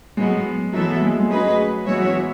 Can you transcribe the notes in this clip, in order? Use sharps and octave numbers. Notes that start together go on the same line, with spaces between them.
A2 F#3 G#3 B3
E3 F#3 B3 E4 A4 E5
G#3
G#3
F#3 A3 C#4 G#4 B4 D#5
E3 G#3 B3 F#4 C#5 E5
F#3
E3
F#3